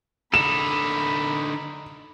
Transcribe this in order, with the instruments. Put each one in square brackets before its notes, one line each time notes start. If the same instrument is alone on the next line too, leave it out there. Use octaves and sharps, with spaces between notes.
[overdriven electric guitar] D3 D#4 [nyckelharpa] B5 [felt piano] E7